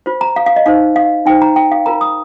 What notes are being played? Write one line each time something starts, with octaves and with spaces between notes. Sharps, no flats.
F4 C5
A#5
F5
F5
D#5
D#4 C5 F5
F5
D#4 C5 G5
A#5
G5
F5
F4 A#4 A#5
D#6